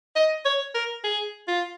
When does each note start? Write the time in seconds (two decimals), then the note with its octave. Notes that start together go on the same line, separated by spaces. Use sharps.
0.15 D#5
0.45 C#5
0.74 A#4
1.04 G#4
1.47 F4